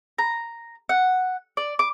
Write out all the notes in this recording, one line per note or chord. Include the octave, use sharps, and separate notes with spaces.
A#5
F#5
D5
D6